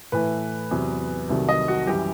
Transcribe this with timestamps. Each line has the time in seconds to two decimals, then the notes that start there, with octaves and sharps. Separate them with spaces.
0.12 A2 E3 A3 B4
0.71 E2 C3 F#3
1.29 C2 C3 D#3 F#3 A3
1.49 D#5
1.68 F#4
1.87 F#2 E3 G3 G4